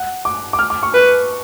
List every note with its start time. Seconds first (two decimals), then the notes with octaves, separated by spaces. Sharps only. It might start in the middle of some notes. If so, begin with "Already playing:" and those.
Already playing: F#5
0.25 D6
0.53 D6
0.59 F6
0.70 D6
0.83 C#6
0.94 B4